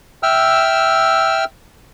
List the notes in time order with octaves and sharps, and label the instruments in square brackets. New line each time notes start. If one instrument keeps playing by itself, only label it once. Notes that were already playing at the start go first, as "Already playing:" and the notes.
[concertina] E5 G5 E6 F6